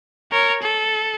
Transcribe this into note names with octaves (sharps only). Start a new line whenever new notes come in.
A#4 C#5
A4